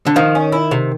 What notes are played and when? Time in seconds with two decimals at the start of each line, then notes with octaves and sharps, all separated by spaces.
0.06 D3
0.16 D#3 F3
0.35 C#4
0.52 E4
0.71 C3